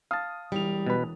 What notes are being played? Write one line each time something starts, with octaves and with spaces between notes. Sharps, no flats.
F5 A5 D#6
E1 E3 G3 F7
B2 B4